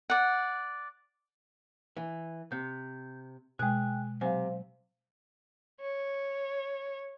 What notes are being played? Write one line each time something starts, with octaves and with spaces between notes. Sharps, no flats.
D5 F#5
E3
C3 G6
B2 G#3 G#4 G5 F#6
C3 F#3 C5 F5 G#5
C#5